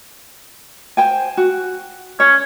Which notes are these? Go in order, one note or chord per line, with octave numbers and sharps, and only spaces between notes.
C5 G5 G#5
F#4
C#4 C#5